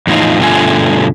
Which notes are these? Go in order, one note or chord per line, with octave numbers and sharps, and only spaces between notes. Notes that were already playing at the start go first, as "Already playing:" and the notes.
E2 A2 F3 D#4 F4
G2 B2 D3 A3 F4 G#5